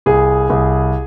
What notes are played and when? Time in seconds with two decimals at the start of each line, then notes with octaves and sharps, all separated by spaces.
0.06 C2 G#4
0.50 C2